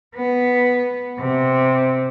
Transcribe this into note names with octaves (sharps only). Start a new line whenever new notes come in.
B3
C3